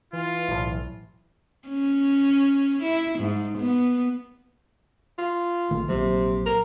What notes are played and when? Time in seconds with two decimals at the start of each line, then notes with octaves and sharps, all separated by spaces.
0.13 E3 F4
0.48 B1 A2
1.68 C#4
2.83 E4
3.19 G#2
3.58 B3
5.19 F4
5.71 A#1 D#3 A3
5.89 A#1 C3 F#3
6.46 A#4